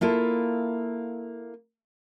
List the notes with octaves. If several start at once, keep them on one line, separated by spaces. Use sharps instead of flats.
A#3 E4 F4 A4